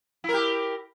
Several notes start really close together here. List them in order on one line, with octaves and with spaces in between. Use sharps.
E4 A#4 G4